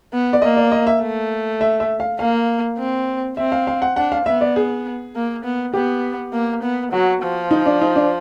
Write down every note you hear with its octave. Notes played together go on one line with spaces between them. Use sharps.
B3
D5
A#3 D#5
D5
D#5
E5
A3
E5
E5
F5
A#3 F5
C4
C4 E5
F5
F5
F#5
D4 F#5
F5
B3 E5
D5
G#4
A#3
B3
B3 G4
A#3
B3
F#3 F#4
F3
D#4
D4
D#4
D4